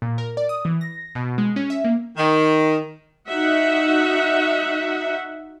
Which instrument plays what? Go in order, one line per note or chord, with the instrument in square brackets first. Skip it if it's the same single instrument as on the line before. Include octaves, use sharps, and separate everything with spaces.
[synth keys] A#2
A#4
D5
D#6
E3
A#6
B2
G#3
C#4
E5
A#3
[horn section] D#3
[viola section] D#4 F#4 E5 F#5